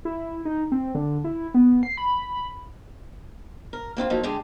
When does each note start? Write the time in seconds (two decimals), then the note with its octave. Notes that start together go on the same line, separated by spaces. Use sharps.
0.05 E4
0.45 D#4
0.72 C4
0.95 D3
1.24 E4
1.54 B3
1.83 C7
1.97 B5
3.73 A#4
3.97 A#3 C4 D#4 F4
4.10 F3 F#3 A#3 D#4
4.23 D3 G#3 G4 G#4